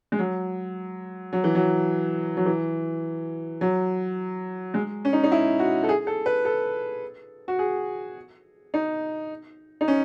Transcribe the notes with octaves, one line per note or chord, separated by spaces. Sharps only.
G#3
F#3
F#3
E3
F#3
F#3
E3
F#3
G#3
C#4
D#4
D#4
E4
F#4
A4
G#4
A4
B4
A4
F#4
G#4
D#4
D#4
C#4